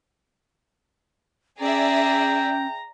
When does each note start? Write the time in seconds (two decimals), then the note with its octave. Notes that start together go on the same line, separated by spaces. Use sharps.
1.60 C#4 G#4 D5 E5 G5 A#5